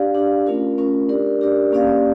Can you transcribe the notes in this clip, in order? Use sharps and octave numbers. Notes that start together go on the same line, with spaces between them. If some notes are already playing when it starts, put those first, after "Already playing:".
Already playing: D4 G4 D5 F5
D4 G4 D5 F5
A3 C#4 F4 A#4
A3 C#4 F4 A#4
D4 G4 A#4 D5
D4 G4 A#4 D5
A#3 C#4 G4 D5 F5